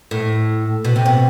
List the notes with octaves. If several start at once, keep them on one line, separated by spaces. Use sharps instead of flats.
A2
B2
C3
B2